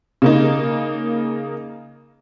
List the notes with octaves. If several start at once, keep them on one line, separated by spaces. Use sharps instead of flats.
C#3 A#3 D#4